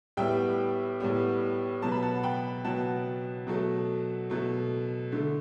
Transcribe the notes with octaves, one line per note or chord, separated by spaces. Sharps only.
A2 G3 B3 E5 G5
A2 G3 B3
B2 F#3 B3 A5
B5
F#5 A5
G5 B5
B2 F#3 B3 F#5 A5
B2 F#3 A3
B2 F#3 A3
D3 A3